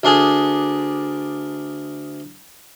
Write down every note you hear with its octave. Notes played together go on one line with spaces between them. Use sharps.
D2 D4 G#4